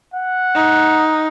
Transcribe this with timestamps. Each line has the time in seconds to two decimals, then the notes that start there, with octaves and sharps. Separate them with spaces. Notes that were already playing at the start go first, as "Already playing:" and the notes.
0.14 F#5
0.55 D#4